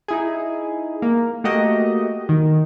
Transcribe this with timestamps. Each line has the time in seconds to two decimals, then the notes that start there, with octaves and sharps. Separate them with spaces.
0.08 D#4 E4 G#4
1.02 A#3
1.44 A3 A#3 F#4 G4 D#5
2.29 D#3